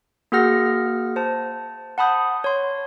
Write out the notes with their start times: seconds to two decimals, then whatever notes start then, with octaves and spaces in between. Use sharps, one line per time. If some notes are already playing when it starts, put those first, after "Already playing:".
0.32 A#3 F#4 G#4 F#5 F6 A#6
1.16 C5 A5
1.98 F#5 A5 B5 D#6 G6
2.44 C#5 C6